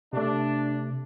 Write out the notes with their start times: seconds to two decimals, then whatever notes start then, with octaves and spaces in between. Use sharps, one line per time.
0.13 C3 A3 D4